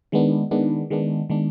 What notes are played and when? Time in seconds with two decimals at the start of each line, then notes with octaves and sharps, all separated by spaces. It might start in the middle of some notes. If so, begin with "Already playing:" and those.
0.12 D#3 G#3 B3 D4
0.51 D#3 G#3 B3 D4
0.90 D#3 G#3 B3 D4
1.30 D#3 G#3 B3 D4